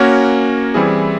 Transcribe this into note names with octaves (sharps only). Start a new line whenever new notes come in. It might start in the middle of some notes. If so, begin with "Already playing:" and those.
Already playing: A#3 C#4 F#4 A#4 C#5
E3 G3 C4 E4 G#4